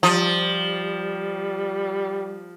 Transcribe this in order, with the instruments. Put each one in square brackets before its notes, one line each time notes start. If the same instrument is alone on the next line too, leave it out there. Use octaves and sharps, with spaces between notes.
[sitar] F3 [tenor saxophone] G3